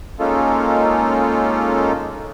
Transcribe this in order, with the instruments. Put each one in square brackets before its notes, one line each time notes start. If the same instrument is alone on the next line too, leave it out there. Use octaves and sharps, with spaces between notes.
[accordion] G#3 A#3 C#4 D#4 F4 A4